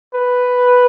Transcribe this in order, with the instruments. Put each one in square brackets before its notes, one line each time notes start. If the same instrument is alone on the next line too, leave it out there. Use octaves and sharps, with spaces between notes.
[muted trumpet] B4